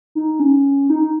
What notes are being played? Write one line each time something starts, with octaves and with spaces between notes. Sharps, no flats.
D#4
C#4
D#4
D#4